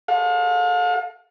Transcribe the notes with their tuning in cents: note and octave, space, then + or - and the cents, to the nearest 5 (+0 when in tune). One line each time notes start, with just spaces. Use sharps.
A4 +0 F5 +40